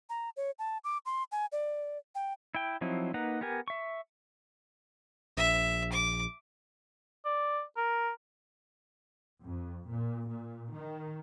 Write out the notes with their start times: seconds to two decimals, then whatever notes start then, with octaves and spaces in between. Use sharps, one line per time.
0.10 A#5
0.37 C#5
0.59 A5
0.84 D6
1.06 C6
1.32 G#5
1.52 D5
2.15 G5
2.55 E4 G5
2.81 F3 F#3 C4 D#4 E4
3.14 A#3 D#4 B4 F#5 A#5
3.41 B3 G4 A#4 G#5
3.68 E5 C#6
5.37 A#1 E5
5.92 D6
7.25 D5
7.77 A#4
9.44 F2
9.90 A#2
10.29 A#2
10.74 D#3